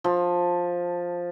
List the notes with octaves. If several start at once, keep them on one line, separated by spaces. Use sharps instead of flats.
F3